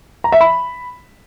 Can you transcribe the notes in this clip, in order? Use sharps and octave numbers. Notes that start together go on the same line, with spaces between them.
A#5
E5
B5